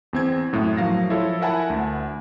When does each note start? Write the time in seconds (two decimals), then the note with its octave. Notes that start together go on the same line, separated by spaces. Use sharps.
0.13 E2 C4 G#6
0.53 F#2 A2
0.77 F3 F#3 A#4 F5 A#6
1.10 F3 E4 F4 A4 C#5
1.41 A#4 E5 F#5 G#5 A5 B5
1.70 D2